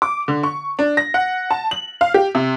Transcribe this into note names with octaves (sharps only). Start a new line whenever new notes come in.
D6
D3
C#6
D4
A#6
F#5
A5
F#7
F5
G4
C3